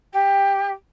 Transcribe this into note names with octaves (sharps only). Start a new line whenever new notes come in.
G4